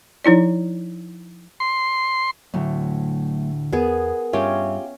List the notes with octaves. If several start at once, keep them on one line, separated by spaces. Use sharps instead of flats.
F3 D#4 E4 D5
C6
D2 A2 F#3 A3
E2 B3 G#4 A#4
G2 C#4 F4 G4 E5